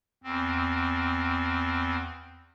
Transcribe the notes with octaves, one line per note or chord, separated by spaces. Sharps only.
E2 C4